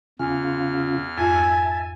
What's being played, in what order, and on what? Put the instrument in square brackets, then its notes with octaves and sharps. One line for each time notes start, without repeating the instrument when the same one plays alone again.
[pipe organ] E2 F6 [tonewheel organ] C#3 F4 [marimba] G#5
[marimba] F2 G#2 F4 [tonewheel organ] E5 A5 [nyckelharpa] G#5